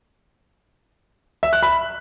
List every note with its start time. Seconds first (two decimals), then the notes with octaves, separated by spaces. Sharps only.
1.43 E5
1.53 F#6
1.63 B5